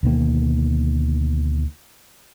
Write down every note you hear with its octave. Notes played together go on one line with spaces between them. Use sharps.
D2 B2 D#3 A#3